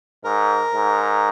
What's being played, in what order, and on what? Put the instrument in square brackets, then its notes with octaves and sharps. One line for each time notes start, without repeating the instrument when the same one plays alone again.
[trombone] G#2 [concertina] A#4
[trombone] G#2